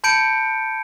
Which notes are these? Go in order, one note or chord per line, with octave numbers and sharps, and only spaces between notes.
A5 B5 G6 C#7 D7